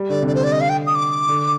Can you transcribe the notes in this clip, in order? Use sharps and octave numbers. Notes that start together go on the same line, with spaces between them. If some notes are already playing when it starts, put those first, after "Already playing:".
Already playing: G3
D3 D5
C3
D3 D5
C5
D5
D#5
F5
G5
D#6
D6
D3